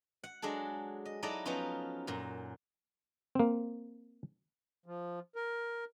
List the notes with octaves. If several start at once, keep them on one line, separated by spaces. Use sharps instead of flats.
F#5
F#3 G#3 D4 G#4 A4
D#5
F#3 D#4 E4 A4 D5 D#5
F3 F#3 B3 C#4 D#4 F4
F#2 A#2
A#3 C4
F3
A#4